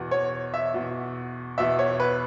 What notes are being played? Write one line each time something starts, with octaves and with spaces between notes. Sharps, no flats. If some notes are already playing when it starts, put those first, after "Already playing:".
Already playing: E2 B2
C#5
E5
E2 B2
E2 B2 E5
C#5
B4